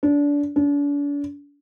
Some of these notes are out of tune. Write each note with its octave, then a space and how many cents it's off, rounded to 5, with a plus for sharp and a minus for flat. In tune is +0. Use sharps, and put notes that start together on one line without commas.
D4 -25
D4 -40